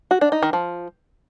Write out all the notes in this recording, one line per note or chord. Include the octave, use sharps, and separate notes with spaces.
F#4
D4
D#4
D#3
F3